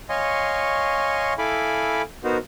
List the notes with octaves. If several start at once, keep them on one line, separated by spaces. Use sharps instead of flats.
C#5 D#5 F5 G#5 C6 C#6
E4 A4 F5 G#5 B5 D6
B3 D#4 F#4 A#4 C5